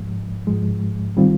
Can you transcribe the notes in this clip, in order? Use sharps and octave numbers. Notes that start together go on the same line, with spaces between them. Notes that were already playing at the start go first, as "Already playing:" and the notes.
Already playing: G#2 F3 G#3
G#2 F3 G#3
D#3 G3 C4 F4